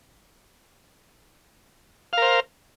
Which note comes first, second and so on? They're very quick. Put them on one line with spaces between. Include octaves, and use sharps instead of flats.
F5 A#4 C5